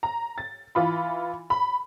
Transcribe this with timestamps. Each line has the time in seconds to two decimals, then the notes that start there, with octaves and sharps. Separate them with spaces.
0.03 A#5
0.38 A6
0.75 E3 F4 B5
1.50 B5